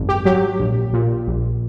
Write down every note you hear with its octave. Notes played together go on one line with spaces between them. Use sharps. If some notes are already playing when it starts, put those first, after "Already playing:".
Already playing: G#1 F#2
G4
F#3 G4
A#1
A#2
A#1